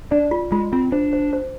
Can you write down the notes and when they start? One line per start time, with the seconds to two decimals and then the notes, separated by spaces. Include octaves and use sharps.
0.11 D4 D5
0.31 F4
0.52 G#3 F4
0.73 C4 F4
0.92 D4 C5
1.13 C5
1.33 C5